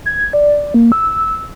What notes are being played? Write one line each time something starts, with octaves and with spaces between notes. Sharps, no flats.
G#6
D5
A#3
E6